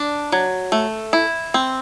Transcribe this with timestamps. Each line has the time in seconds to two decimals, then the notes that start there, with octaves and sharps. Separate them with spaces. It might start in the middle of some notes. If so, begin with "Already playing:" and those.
Already playing: D4
0.32 F#3
0.72 A3
1.13 E4
1.54 C4